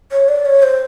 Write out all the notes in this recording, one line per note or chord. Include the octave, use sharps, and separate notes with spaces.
C#5
D5
C#5
C5